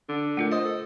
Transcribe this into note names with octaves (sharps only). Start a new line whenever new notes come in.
D3
A3 F4 A#4
C5 D#5 A5
A4